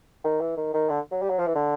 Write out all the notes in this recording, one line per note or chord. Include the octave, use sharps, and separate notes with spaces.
D#3
E3
D#3
D#3
D3
F#3
G3
F#3
F3
E3
D3